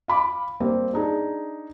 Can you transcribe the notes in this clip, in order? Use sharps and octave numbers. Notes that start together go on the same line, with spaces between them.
F5 B5 D6
G3 A#3 C4
D4 D#4 G#4